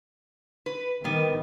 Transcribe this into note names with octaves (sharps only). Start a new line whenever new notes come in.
B4
D#3 G3 B3